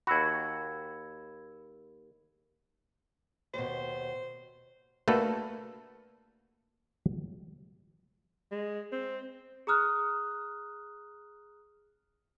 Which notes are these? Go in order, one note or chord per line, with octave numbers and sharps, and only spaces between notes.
D#2 F#4 B5 E6 G#6
D#2 B2 C5
A3 A#3 D4 F#4 A4 B4
G#3
C4
G#4 A#5 D#6 F6 F#6